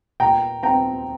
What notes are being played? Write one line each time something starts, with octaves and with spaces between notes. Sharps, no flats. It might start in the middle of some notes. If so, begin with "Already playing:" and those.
A#2 G5 A#5
C4 G5 A#5